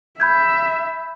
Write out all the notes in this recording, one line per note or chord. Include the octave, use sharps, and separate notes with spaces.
E5 B5 G6 G#6